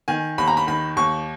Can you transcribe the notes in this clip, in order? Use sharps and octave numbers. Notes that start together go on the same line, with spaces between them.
D#3 G#5
D#2 B5
A#5
B5
D#3 B5
D#2 C#6